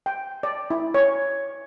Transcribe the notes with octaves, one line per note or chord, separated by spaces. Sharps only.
G5
D5
E4
C#5